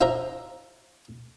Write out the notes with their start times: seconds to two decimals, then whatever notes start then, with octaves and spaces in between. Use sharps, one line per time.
0.01 E4 F4 C5 D#5 E5 A#5